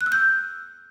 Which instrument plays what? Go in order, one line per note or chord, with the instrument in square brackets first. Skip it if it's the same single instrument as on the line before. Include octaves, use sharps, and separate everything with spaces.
[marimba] F#6
E6
G6